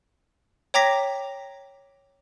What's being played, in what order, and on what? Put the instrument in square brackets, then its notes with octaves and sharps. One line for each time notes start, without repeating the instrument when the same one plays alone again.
[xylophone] C#5 G5 A#5 D6 A#6 B6